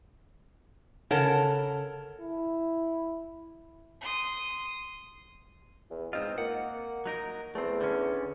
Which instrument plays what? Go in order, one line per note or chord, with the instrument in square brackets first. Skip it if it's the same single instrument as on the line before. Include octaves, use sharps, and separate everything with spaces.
[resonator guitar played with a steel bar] C#3 A4 A#4 C#5 F#5 A5
[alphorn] E4
[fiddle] C6 D#6
[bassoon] E2
[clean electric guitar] G#2 C4 F4 [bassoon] D#4
[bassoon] A#3 [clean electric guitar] F#5
[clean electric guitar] F#3 D#4 A#4
[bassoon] E2 [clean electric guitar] A3 C4
[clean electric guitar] D3 C#4